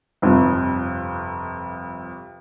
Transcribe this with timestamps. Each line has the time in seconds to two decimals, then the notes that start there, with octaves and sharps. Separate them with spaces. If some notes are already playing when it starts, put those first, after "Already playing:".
0.22 G1 F2 C3